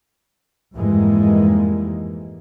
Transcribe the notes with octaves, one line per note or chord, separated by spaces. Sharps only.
F2 G#2 E3 G3 G#3 A#3